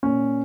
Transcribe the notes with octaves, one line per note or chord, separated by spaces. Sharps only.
A#2 C#4